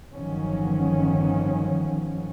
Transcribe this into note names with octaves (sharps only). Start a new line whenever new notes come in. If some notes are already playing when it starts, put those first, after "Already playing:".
G1 D#3 F3 F#3 C#4